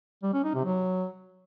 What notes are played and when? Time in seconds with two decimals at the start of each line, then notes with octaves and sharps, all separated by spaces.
0.23 G3
0.33 C#4
0.44 D#4
0.54 C3
0.65 F#3